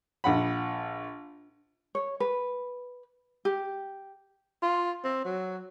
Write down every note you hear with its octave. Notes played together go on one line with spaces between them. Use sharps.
A#1 F#5 B5
C#5
B4
G4
F4
C4
F#3